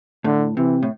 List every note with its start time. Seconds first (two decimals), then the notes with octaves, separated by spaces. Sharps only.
0.24 A2 D3
0.56 C3 E3
0.83 A2